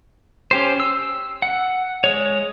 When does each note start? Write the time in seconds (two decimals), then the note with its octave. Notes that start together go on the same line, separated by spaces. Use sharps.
0.51 C#4 G4 C5
0.80 E6
1.42 F#5
2.04 G#3 C#5